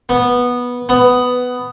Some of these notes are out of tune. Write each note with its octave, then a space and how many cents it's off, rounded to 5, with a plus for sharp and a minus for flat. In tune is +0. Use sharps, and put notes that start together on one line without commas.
B3 -10
B3 +10